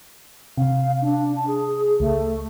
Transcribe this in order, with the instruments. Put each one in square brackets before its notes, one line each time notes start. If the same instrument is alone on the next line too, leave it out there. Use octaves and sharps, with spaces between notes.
[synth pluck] C3 [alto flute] F5
[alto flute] D4
A5
G#4
[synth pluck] C#2 [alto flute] A3